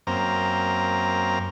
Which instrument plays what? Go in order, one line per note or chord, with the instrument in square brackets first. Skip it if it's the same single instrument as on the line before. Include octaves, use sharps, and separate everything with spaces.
[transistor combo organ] F#2 A#3 C4 A#5